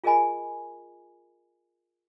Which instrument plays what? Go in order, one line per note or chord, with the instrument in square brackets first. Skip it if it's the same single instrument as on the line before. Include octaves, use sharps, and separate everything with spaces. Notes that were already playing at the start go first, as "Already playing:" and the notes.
[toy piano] F4 G#4 A#4 D#5 G#5 B5